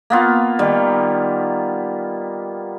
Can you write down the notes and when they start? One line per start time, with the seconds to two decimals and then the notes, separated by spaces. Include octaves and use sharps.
0.10 A#3 B3 F4
0.59 D#3 G3